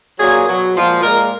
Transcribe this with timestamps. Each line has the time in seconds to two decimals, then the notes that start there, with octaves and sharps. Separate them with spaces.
0.17 A#2 F#3 G#4
0.45 B2 F#3
0.73 A#2 F3 G#3
1.01 A#2 G#3 A#4